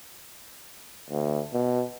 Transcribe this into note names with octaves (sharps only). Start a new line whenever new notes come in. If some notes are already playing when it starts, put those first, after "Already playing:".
D2
B2